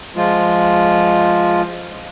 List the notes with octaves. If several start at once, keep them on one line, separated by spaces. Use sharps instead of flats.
F3 G#3 F4